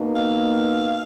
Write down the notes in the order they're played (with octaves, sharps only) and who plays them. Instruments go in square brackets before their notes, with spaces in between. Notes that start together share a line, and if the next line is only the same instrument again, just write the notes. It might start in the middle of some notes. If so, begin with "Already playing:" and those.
Already playing: [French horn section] B2 A#3 D#4
[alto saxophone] F5